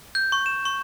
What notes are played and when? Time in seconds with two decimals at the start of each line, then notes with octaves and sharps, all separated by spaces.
0.15 G6
0.32 C#6
0.46 E7
0.65 C#6